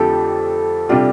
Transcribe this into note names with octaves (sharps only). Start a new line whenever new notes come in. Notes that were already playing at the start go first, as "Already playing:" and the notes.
Already playing: F2 D3 F3 A3 C4 G4 A4
C3 G3 D4 F4 G4